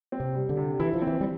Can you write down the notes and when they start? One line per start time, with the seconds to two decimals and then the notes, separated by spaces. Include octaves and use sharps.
0.12 C4
0.20 C3
0.35 G3
0.49 D3
0.57 C3
0.80 E3 E4
0.93 F3
1.02 C4
1.07 E3
1.21 G3